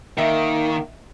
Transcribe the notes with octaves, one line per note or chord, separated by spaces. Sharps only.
D#3 A#3 D#5 E5